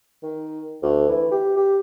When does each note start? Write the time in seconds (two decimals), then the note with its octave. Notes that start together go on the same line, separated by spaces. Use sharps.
0.22 D#3
0.82 D2
1.09 E3
1.31 G4
1.56 G4